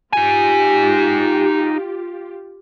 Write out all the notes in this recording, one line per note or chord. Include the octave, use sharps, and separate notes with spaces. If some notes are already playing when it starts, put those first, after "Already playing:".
D#4 F4 G4 G#5